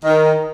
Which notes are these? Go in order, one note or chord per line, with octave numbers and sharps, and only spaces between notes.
D#3